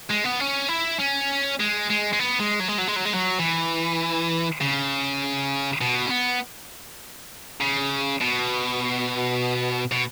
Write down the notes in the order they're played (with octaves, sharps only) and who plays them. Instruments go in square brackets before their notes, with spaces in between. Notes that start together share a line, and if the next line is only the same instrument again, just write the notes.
[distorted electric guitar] G#3
B3
C#4
E4
C#4
G#3
G#3
G#3
B3
G#3
F#3
G#3
F#3
G#3
F#3
G#3
F#3
E3
C#3
B2
C#4
B3
C#3
B2
B2